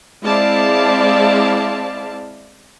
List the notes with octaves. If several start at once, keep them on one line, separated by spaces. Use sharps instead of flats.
G#3 C4 E4 D5 F5 A5